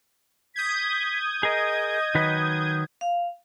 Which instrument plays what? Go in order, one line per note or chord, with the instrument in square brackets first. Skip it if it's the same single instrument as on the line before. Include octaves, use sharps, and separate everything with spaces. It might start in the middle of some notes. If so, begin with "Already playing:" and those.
[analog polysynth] D#6 G6 G#6 [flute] B6
[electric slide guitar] G#4 A#4 [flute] D#5
[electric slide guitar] D#3 F#3 B4
[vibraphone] F5